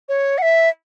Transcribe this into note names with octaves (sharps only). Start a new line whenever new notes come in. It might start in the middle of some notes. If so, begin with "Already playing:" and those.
C#5
F#5
E5